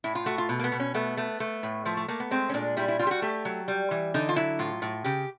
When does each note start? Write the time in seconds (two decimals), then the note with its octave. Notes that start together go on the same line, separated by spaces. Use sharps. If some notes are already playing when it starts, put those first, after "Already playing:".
0.04 A2 E4
0.15 F4
0.26 A3 F#4
0.38 F4
0.49 B2
0.59 A#3
0.64 B3
0.72 B2
0.80 C#4
0.94 A3 B3
1.17 A3
1.40 A3
1.63 A2
1.85 F3 A3
1.97 A3
2.08 A3 A#3
2.20 B3
2.31 G#3 C4
2.49 C#4
2.54 A#2 D4
2.77 G3 E4
2.88 E4
2.99 G3 F4
3.07 G4
3.11 F#4
3.22 A3 G4
3.45 F#3
3.68 G3
3.91 E3
4.14 D3 D#4
4.29 F4
4.36 F#3 E4
4.59 A2 F4
4.82 A2
5.04 C#3 G4